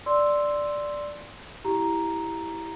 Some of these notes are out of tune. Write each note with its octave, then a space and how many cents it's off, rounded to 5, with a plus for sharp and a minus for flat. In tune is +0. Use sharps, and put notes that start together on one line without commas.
D5 +0 C6 +0 E6 +0
E4 +0 G4 +0 A#5 +0